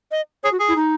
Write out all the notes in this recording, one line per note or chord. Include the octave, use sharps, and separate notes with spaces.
D#5
G#4 C#5
F#4
G#4
E4
D#4